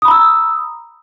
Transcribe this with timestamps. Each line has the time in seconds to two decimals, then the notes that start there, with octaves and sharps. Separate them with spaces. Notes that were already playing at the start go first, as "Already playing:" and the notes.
0.02 D#6
0.05 B5
0.08 A#5
0.11 E6